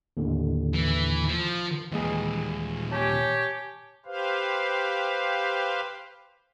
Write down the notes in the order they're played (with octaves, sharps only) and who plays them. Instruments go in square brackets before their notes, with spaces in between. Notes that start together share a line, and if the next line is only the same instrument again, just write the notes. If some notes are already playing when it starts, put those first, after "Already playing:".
[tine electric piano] D#2 A2 D3
[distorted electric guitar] E3
F3
[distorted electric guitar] D#2 A#2 [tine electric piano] E3 G#3 G#4
[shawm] G4 [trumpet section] C#5 [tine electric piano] G#5 A5
[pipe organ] G4 B4 C5 F5